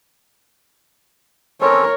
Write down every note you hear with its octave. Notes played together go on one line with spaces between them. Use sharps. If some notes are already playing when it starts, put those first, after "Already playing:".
C4 C#4 A4 A#4 C#5